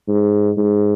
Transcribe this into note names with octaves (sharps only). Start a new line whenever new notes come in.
G#2
G#2